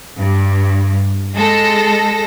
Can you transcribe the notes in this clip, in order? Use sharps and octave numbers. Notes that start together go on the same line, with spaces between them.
G2
G#3 A4 A#6